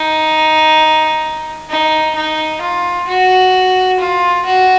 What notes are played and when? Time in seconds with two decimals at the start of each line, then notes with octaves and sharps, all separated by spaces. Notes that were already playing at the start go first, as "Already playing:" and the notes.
Already playing: D#4
1.69 D#4
2.15 D#4
2.61 F4
3.08 F#4
4.00 F4
4.46 F#4